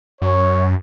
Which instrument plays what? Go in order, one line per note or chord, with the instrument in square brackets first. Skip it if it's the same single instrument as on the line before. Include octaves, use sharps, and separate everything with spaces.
[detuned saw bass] F#2 [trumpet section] C#5